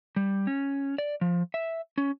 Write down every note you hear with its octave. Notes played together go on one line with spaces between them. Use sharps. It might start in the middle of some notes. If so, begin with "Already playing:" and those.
G3
C#4
D5
F3
E5
C#4